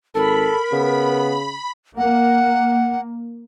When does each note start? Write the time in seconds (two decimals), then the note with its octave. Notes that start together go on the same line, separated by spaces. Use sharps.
0.15 G#1 A4 A#4 B5
0.73 C#3 B3
1.98 A#3 F#5